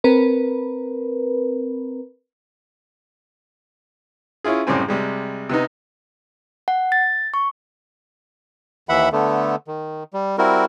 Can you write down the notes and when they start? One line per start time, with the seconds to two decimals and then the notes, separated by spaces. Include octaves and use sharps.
0.04 C4 A#4 B4
4.44 C#4 E4 F4 G#4
4.67 F#2 A2 C#3 G3 C4 G#5
4.88 C3 G3 G#3
5.49 C3 B3 D#4
6.68 F#5
6.92 A6
7.34 C#6
8.89 D#2 E3 E5 F#5 B5
9.12 D3 A3 B3
9.68 D#3
10.13 G3
10.38 G3 C4 E4 F#4 A#4